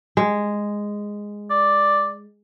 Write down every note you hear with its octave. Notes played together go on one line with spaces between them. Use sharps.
G#3
D5